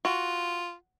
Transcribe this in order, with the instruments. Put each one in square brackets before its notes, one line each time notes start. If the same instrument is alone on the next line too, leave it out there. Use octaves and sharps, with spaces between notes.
[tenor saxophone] F4 [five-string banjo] F#4